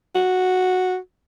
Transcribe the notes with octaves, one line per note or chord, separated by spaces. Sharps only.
F#4